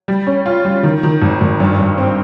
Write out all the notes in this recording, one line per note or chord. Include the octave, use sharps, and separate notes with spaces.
G3
C#4
F4
G3
D#3
D#3
G#1
G#1
G2
G2
C4